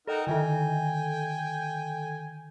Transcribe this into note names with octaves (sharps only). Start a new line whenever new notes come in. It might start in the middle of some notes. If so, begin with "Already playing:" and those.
D#4 A4 A#4 D#5 F#5 G5
D3 D#3 A4 G5 G#5